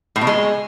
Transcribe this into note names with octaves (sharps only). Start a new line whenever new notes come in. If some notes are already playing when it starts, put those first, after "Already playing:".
A2
B2
G#3